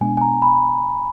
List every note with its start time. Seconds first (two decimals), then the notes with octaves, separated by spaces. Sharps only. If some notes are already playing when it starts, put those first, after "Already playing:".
0.01 B2 G#3 B3 D4 G#5
0.17 G#5
0.21 A#5
0.42 B5